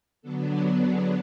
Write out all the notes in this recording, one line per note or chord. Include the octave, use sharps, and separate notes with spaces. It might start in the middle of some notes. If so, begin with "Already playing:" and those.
D3 F#3 B3 D4 A4
G4
G#4